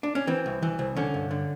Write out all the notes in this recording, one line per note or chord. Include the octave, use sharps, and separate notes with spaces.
D4
C#4
E3 C4
C2
E3
C2
D3 C#4
G2
D3